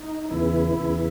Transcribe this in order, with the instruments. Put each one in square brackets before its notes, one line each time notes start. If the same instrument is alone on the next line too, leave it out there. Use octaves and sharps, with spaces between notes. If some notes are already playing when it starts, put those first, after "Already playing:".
Already playing: [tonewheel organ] D#4
E2 C#3 E3 E4
E2 C#3 E3